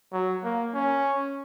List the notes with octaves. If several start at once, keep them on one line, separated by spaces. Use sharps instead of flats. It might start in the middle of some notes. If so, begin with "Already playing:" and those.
F#3
A#3
C#4